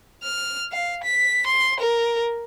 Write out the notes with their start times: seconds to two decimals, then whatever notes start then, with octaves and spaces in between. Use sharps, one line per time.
0.23 F6
0.72 F5
1.04 B6
1.47 C6
1.80 A#4